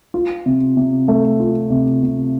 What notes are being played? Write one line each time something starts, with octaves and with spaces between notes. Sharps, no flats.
F4
C3
C3
A3
F4
C3
C3